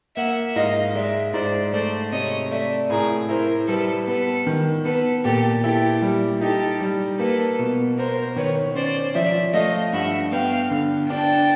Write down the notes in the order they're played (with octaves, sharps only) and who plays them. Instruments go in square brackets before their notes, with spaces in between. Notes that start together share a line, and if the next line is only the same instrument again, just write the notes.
[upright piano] A#3 [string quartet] E5 F#5
[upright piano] G#2 [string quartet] D#5 F5
[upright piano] G#3 [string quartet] D5 E5
[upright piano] G#2 [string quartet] C5 D5
[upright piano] A3 [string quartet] C5 D5
[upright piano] C3 [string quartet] C#5 D#5
[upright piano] A3 [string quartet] D5 E5
[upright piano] A2 [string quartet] G#4 A#4
[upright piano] E4 [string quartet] A#4 C5
[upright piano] G3 [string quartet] A4 B4
[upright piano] B3 [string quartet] A4 B4
[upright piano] D#3
[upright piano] B3 [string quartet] A4 B4
[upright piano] A#2 [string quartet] G4 A4
[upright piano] E4 [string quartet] G4 A4
[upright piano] G3
[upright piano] D#4 [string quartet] G4 A4
[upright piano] G3
[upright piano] A#3 [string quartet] A4 B4
[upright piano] B2
[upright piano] B3 [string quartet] A#4 C5
[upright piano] D#3 [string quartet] B4 C#5
[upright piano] C#4 [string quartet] C5 D5
[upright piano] F3 [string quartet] D5 E5
[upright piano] A3 [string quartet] D#5 F5
[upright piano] G2 [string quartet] E5 F#5
[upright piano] B3 [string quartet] F5 G5
[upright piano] D3
[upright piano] D4 [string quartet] G5 A5